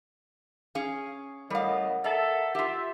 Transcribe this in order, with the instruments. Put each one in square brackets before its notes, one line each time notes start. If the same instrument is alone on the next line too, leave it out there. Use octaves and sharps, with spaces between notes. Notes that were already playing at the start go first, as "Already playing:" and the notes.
[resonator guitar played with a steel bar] C#4 G#4 F5
[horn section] A2 C#3 D#5 [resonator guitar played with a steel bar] G3 F5 [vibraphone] A#4 F#5
[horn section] A4 E5 [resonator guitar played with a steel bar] D5 A#5
[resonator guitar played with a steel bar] F4 G4 [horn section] E5